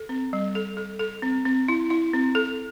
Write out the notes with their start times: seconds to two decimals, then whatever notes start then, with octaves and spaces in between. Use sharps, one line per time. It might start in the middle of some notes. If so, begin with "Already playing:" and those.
Already playing: A4
0.09 C4
0.33 G3
0.55 A4
0.77 A4
1.00 A4
1.22 C4
1.46 C4
1.68 E4
1.90 E4
2.13 C4
2.35 A4